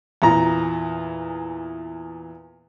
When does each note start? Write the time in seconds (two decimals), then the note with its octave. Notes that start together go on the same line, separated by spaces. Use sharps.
0.22 E2 A#2 A#5